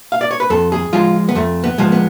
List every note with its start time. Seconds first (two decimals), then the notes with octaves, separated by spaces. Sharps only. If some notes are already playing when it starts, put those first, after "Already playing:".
0.12 F5
0.21 D5
0.31 C#5
0.40 B4
0.50 F2 A4
0.72 G#4
0.93 F3 G#3 F4
1.29 B3
1.35 F2 A3
1.64 B3
1.78 F3 G#3
1.92 B3